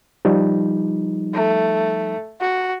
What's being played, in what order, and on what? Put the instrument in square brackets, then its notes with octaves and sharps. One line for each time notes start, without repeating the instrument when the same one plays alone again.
[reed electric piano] F3 G3 D#4
[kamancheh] A3
F#4